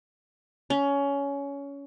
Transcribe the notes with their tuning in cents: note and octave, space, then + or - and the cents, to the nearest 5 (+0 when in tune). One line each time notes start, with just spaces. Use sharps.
C#4 +20